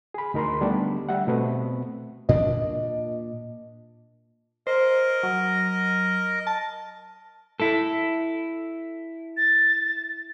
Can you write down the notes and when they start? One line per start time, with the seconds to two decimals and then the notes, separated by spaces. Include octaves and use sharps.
0.14 G#4 B5
0.34 D2 D#4 A#4 B5 C6
0.61 D3 G3 A3 B3 D4
1.09 G3 E5 F#5
1.27 B2 A3 B3 C4 B4
2.29 A#2 D4 D#5
4.67 A#4 C5 D#5
5.23 F#3
6.47 A5
7.60 E4 A4
9.37 A6